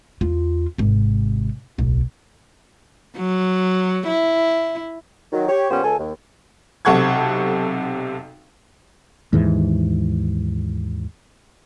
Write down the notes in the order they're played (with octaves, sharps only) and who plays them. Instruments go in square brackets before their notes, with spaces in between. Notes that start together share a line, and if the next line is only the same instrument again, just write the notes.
[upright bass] E2 F4
G#1 C3
D1 B1
[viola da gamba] F#3
E4
[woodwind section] D#3 F#3
G4 C#5
A#2 F3 B3 C#4 G4 C5
C#2 A4 G#5
D#2
[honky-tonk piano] B1 C3 A4 F#5 C#6 G#6
[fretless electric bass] D#2 G#2 E3